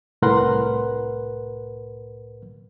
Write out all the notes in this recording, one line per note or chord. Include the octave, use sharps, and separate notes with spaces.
C2 A2 A#4 B4 F#5 C6